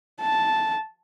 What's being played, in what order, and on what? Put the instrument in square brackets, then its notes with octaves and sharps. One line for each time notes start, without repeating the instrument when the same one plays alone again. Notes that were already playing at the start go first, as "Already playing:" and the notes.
[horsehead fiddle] A5